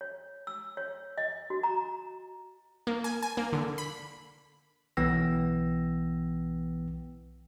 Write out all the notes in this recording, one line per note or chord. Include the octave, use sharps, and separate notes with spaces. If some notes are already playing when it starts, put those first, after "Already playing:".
C#5
E6
C#5
D#5
F#4
A#5
A#3
G#5
G#5
A#3
D3
B5
B1 E3 B3 G5 E6 A#6